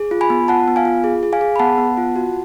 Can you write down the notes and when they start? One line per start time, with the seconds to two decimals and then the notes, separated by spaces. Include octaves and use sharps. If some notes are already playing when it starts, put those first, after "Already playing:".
Already playing: G#4
0.11 F4
0.21 G#5 B5
0.30 B3
0.48 F4 F#5 A5
0.68 B3
0.76 F5 G#5
0.85 F4
1.04 G#4
1.23 G#4
1.33 F5 G#5
1.41 G#4
1.56 B5
1.59 B3 F#5 A5
1.78 B3
1.97 F4
2.16 F#4